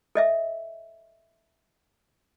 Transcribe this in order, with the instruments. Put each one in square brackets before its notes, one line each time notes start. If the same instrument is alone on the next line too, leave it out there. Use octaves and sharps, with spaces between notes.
[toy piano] A4 D#5 E5